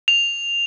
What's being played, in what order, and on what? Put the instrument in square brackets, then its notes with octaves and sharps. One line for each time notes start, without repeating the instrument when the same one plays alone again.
[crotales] F7